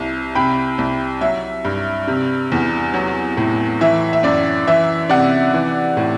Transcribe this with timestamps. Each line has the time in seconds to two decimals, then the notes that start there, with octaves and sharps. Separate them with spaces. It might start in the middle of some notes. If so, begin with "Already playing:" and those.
Already playing: C2 C3
0.35 C3 G5 B5
0.79 C2
1.21 F#3 E5
1.65 G2
2.07 C3
2.52 E2
2.94 F#3
3.37 A2
3.81 E3 E5
4.13 E5
4.23 F#2 D5
4.67 E3 E5
5.10 C3 D5 F#5
5.54 E3
5.97 A2